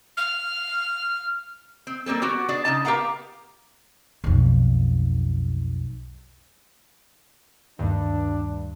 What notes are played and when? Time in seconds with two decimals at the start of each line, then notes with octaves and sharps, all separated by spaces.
0.17 F6
1.87 C4
2.06 G3 A#3 C4 A4
2.22 B3 F#4 G4
2.49 D4 G#4 D5
2.65 C#3 D#4 A5
2.85 B3 G4 A#4 F5 F#5 A#5
4.24 B1 F2
7.79 D2 G2 D#3 A3 D4